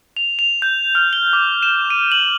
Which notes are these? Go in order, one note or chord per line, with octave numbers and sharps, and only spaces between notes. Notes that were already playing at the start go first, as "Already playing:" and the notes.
F7
F7
G6
F6
G7
D6
E7
D#7
F#7